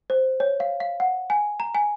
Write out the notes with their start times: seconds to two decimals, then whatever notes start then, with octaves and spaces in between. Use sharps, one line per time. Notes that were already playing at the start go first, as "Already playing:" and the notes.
0.10 C5
0.40 C#5
0.60 F5
0.80 F5
1.00 F#5
1.30 G#5
1.60 A#5
1.75 G#5